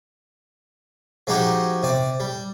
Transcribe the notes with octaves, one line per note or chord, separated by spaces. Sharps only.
F3 G#3 D#4 F#4 G4
C3 D5
G3